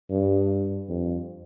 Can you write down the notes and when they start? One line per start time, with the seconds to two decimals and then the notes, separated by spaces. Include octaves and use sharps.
0.10 G2
0.89 F2